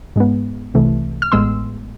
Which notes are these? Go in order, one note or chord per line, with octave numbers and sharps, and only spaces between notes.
G#2 G#3 B3
C2 C3 E3 A3
F6
A1 A2 G#3 B3 C6 E6